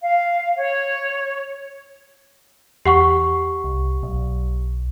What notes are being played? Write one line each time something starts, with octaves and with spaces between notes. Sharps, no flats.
F5
C#5
E2 G4 F#5 C#6
C2
B1